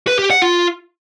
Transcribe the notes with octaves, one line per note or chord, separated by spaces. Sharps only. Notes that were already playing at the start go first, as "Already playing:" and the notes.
B4
G4
F#5
F4